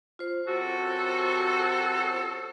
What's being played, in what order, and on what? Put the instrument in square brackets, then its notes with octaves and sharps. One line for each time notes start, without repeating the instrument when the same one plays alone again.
[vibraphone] F4 C5
[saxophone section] F#2 C3 F#4 [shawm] A4